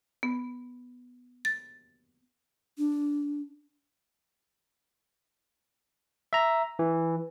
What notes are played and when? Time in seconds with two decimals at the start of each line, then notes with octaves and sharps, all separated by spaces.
0.23 B3
1.45 A6
2.78 D4
6.33 E5 A#5
6.79 E3